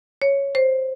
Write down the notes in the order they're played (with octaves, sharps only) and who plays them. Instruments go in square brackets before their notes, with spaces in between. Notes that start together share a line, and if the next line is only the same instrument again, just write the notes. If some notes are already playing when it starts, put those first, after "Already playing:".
[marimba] C#5
C5